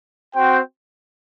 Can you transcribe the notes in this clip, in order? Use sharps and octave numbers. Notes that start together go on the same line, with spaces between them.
C4 F#4 C5 G5